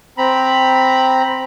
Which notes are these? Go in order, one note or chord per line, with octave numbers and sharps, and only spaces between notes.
C4 A#5 B5